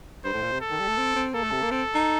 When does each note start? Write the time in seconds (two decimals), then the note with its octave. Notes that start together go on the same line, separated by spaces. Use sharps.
0.24 G2 C5
0.33 A2
0.43 A#2
0.51 C3
0.61 A4
0.70 D#3
0.79 G3
0.88 A3
0.98 C4
1.16 C4
1.34 A#3 A4
1.43 A3
1.52 C3
1.62 A#3
1.71 C4 A4
1.95 D#4